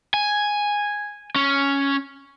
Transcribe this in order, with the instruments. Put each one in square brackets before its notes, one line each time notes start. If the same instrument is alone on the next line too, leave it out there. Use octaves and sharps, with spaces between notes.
[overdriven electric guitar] G#5
C#4